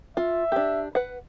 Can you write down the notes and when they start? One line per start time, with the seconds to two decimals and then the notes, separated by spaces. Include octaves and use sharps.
0.17 F4 E5
0.52 D4 G4
0.95 B4 F#5